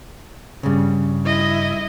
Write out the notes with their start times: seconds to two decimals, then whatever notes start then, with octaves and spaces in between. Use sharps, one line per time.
0.63 G2 C#3
1.26 E4 D#5